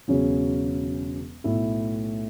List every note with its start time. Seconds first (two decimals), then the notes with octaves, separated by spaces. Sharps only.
0.08 E1 E2 C#3 F#3 C#4
1.44 B1 A2 A3 E4